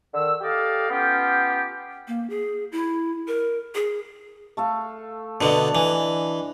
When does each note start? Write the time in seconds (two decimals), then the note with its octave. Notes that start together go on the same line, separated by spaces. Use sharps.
0.14 D3 D#3 E6
0.41 G4 A4 D5 D#5 F5
0.90 B3 C#4 F4 G4
2.08 A#3
2.30 G#4
2.72 E4
3.28 A#4
3.75 G#4
4.57 A3 A4 F5
5.41 B2 D3 D4 D#5
5.75 E3 G#5